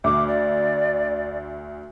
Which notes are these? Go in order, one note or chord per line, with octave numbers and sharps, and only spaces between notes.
D2 D6
D5